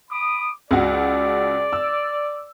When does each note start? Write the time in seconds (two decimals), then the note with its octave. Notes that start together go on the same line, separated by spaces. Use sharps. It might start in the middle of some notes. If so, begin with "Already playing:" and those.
0.10 B5 D6 D#6
0.71 C#2 F#4 D5
1.73 E6